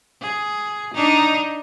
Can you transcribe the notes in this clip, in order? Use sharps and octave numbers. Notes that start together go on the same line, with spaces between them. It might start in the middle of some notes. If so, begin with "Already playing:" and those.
G#4
D4 D#4